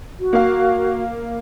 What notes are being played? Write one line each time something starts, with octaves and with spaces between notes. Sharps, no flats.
F#4
A#3 F5